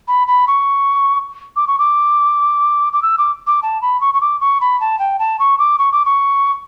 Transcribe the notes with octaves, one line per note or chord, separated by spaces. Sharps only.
B5
B5
C#6
D6
C#6
D6
D6
E6
D6
D6
A5
B5
C#6
C#6
D6
C#6
B5
A5
G5
A5
C#6
D6
C#6
D6
C#6